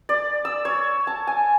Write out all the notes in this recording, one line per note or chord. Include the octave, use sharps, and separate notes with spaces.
D5
E6
C#5
A5
G#5